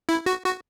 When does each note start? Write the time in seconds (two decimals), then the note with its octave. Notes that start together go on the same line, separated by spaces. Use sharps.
0.09 E4
0.26 F#4
0.44 F#4